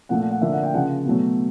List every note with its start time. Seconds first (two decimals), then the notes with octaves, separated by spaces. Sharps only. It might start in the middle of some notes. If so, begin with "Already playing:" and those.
0.09 A#2 F3 A3 F#5
0.20 F#5
0.31 F#5
0.41 D3 F3 A#3 E5
0.52 F#5
0.63 G5
0.74 C#3 F3 A#3 F#5
1.05 B2 F#3 A3